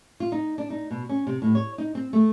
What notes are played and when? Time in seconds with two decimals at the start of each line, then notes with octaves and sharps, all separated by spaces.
0.20 F4
0.32 D#4
0.58 D4
0.70 D#4
0.91 B2
1.09 C#4
1.27 C3
1.42 A2
1.55 C#5
1.78 D#4
1.95 C4
2.13 A3